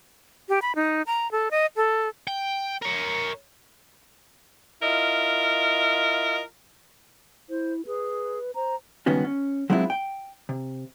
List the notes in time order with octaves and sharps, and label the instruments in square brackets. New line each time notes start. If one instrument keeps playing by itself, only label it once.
[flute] G4
B5
D#4
A#5
A4
D#5
A4
[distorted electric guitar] G5
A#4 C#5
[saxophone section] E4 F4 A#4 D#5
[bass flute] E4 [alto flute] C5
[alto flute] G#4 [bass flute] B4
[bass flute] C5 [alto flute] A#5
[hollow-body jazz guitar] C#2 G2 D#3 B3 C#4 F#4
C#4
F#3 G#3 C4 D4 E4 F4
G5
C3